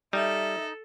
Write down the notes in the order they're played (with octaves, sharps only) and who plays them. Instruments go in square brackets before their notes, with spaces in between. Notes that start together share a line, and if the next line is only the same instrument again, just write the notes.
[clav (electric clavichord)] G3 [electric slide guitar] D#4 [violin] A4 [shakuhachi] E5